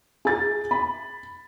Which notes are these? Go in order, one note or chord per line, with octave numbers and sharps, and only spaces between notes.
G#4 A6
B5